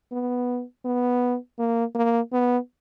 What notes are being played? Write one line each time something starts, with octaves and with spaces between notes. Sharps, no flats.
B3
B3
A#3
A#3
B3